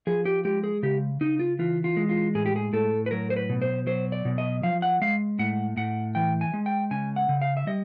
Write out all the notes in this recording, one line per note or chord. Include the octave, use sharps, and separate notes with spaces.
F3 G#4
G4
G#3 G4
G#4
C#3 G4
C#3 D#4
F4
E3 F4
F4
G#3
F4
A2 G#4
G4
G#4
A2 A4
B4
F#3 A#4
C5
B4
B2
C5
F#3 C5
D5
B2
D#5
F3 F5
F#5
G#3 F5
A2 F#5
A2 F#5
E3 G5
G#5
G#3
G5
C#3 G#5
F#5
C#3
F5
E5
G3 D#5